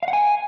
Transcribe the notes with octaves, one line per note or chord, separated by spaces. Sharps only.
F5
F#5
G#5